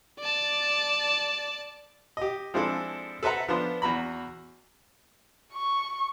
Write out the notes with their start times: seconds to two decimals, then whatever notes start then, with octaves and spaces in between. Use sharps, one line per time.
0.19 D5 A5
2.17 G4 D#5
2.54 F3 G#3 C4 D4 E4 A4
3.23 A4 B4 C5 E5 F#5 A#5
3.48 F3 B3 D4 C5
3.82 E2 F#4 A#5 B5
5.54 C#6